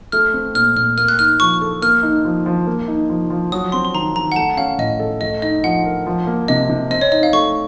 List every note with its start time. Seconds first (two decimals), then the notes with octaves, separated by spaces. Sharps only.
0.12 A3 F6
0.34 C4
0.54 A#2 F6
0.76 A#2 F6
0.98 A#3 F6
1.08 F#6
1.19 D#4 F6
1.40 F3 C#6
1.61 A4
1.82 A#3 F6
2.03 D#4
2.25 F3
2.46 F3
2.67 A#3
2.88 D#4
3.09 F3
3.30 F3
3.52 F#3 D#6
3.72 C4 C6
3.85 C6
3.94 D#3 A#5
4.15 D#3 A#5
4.32 F#5
4.36 A3 A5
4.57 C#4 F5
4.78 A2 D#5
5.00 A4
5.21 A3 D#5
5.42 D#4 D#5
5.64 F3 F#5
5.85 A#4
6.06 F3
6.27 A#3
6.48 C3 D#5
6.69 C3
6.90 C4 D#5
7.01 C#5
7.12 D#4 D#5
7.23 F5
7.33 A3 C#6